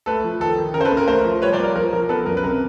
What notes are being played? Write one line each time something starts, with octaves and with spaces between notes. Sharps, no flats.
A3 A4 B4
F3
D#3 A4
D#3
C#3 A#4
C5
A4 B4
A#3
A#4
A3 A#4 C5
F3
G3 B4 C#5
C5 D5
A#3
A#4
F3 A#4
F3 A#4
B3 A4 B4
F#2 A#4
B4
C3 A#4